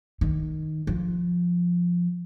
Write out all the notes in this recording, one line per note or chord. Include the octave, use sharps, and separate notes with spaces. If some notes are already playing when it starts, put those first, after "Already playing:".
D#3
F3